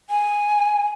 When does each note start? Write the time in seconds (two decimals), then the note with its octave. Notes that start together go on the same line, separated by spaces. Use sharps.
0.10 G#5